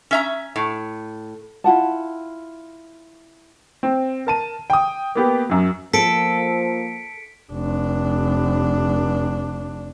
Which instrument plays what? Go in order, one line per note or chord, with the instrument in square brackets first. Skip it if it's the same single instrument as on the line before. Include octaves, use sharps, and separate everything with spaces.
[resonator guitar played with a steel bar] C#4 E5 A#5
A2
[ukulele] E4 F4 F#5 A5
[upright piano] C4
A#4 A5 D#7
G5 D#6
A#3 B3 G4
F#2 F#3
[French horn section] F3 A#3 [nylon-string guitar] A4 [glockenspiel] B6 C#7 D7
[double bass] F1 D4